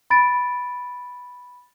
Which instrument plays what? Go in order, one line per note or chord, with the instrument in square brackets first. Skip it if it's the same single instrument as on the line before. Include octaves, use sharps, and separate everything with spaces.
[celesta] B5 A6 D7